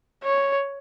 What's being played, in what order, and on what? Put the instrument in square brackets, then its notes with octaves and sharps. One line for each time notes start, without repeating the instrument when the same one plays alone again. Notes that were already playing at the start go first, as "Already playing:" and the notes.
[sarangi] C#5